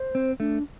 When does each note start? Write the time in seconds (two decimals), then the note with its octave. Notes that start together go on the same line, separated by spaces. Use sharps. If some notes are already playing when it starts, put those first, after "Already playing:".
Already playing: C5
0.15 C4
0.40 A3 D4